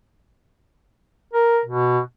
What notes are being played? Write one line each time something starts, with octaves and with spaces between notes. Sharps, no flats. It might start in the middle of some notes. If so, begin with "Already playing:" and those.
A#4
B2